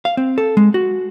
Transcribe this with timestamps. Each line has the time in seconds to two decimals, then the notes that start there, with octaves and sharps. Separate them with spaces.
0.05 F5
0.17 C4
0.38 A4
0.57 G#3
0.74 F#4